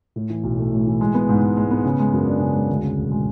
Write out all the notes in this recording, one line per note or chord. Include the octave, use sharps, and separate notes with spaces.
A2
E3
B1
A3
A2
E3
G#3
B3
G#2
G#2
G#3
B3
C#3
G#3
F#2
D4
C#3
G#3
D2
C#3
E1
G#3